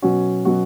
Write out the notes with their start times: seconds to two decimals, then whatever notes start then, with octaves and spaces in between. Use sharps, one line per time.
0.02 B2 F#3 C#4 F#4
0.45 B2 F#3 C#4 F#4